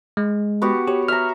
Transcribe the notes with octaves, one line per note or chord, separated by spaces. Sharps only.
G#3
B3 F#4 G4
G4 C#5
E5 A#5 F6